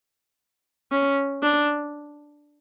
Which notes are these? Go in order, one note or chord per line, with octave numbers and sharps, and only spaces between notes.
C#4
D4